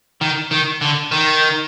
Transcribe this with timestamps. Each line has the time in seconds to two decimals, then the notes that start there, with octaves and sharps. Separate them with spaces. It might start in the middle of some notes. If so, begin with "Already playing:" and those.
0.21 D#3
0.51 D#3
0.81 D3
1.12 D#3